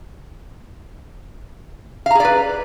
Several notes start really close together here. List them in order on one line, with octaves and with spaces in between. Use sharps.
F5 A#5 G#4 D5 B4